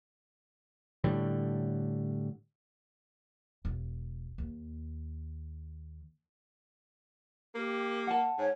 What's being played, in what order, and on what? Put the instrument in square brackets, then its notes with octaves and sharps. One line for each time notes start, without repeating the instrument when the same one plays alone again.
[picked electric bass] A2 D3 G3
[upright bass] E1
D#2
[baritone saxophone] A#3 [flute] G4
[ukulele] F#5 A5
[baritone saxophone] G#2 [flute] C#5